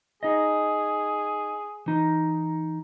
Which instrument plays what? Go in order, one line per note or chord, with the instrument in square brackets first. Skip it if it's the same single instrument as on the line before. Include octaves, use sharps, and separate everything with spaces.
[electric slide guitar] D#4 D#5 [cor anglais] G#4
[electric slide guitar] E3 D#4